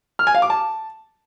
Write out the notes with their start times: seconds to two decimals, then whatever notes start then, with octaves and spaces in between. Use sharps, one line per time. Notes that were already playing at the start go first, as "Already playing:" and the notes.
0.19 F6
0.27 G#5
0.35 F5
0.42 D6
0.50 A5